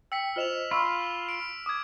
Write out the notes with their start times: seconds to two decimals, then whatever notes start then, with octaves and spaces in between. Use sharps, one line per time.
0.12 G5 E6 B6 C#7
0.36 F4 C5 D#5 F6 E7 F7
0.71 F4 B5 C#6 E6
1.29 D7
1.66 D6 D#6 G#6